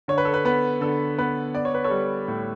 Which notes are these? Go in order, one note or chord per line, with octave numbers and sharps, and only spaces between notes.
D3 C#5
B4
A4
B4
B3 B4
D3 A4
B3 B4
B3 D5
C#5
B4
A4 C#5
G3
A2